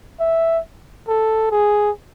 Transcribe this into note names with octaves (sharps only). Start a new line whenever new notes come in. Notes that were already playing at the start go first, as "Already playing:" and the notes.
E5
A4
G#4